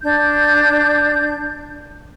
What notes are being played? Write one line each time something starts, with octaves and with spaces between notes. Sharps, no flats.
D4 G6